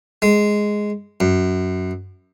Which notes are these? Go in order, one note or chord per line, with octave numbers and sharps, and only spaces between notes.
G#3
F#2